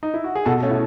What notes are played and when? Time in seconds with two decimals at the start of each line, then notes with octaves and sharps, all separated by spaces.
0.03 D#4
0.14 E4
0.24 F#4
0.35 G#4
0.45 B2 F#4 A4
0.62 A3 C#4
0.71 E4